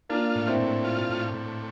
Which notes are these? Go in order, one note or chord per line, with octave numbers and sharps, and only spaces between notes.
A#3 D4 F4
A2
C4 E4
A2
F4
A2
A2